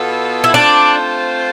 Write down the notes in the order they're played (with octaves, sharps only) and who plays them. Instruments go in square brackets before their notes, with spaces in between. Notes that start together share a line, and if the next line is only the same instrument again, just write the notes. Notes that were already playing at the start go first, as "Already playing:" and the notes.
Already playing: [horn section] B2 B3 F4 A4
[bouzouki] E4
[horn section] A3 C4 F4 A4 C5 [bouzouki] D4